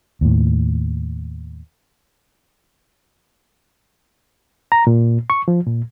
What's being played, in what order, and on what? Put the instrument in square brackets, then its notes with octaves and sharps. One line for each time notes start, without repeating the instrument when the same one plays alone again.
[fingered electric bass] D#2 A2
[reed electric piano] A#5
A#2
C#6
F3
A#2